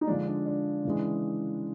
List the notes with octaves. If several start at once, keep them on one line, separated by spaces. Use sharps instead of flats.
D#4
D3 F3 G#3 D4
D4
D4
C#3 E3 G#3